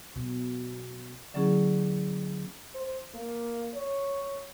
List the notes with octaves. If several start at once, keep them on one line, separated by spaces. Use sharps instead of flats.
B2
D3 F#3 A#3 C#4 E4 G#4
C5
A#3
C#5